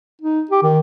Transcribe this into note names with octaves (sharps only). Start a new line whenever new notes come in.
D#4
G4
D#3